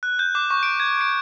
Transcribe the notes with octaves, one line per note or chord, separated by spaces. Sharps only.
F#6
G6
D6
C#6
D7
G#6
D7